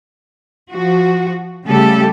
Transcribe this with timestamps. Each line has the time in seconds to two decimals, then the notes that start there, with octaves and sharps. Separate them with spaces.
0.71 F3 F#4
1.66 C#3 G3 A3 G4 A4